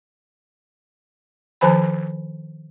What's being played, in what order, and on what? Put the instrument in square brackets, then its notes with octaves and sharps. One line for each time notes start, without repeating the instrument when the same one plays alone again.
[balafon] D#3 F3 C5 G#5 B5